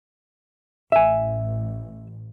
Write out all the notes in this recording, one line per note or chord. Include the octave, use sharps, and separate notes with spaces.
A1 E5 G#5